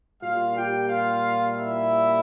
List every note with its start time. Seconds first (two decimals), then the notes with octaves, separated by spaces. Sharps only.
0.22 A#2 G3 A#3 F4 F5
0.56 G4 G5
0.89 F4 F5
1.56 E4 E5